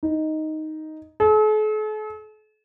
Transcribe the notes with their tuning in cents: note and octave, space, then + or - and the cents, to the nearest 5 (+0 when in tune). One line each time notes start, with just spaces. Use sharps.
D#4 +5
A4 -45